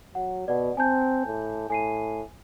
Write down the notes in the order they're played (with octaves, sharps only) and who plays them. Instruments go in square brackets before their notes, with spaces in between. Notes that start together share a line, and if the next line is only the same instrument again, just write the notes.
[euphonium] F#3 [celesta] F#5
[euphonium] B2 [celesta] D5 F#5
[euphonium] C4 [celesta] G#5 A5 G6
[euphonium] A2
[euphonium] A2 [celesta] G#5 C7 D#7